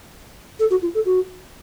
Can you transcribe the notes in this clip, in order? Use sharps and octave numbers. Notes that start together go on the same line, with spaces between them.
A4
F#4
F4
A4
F#4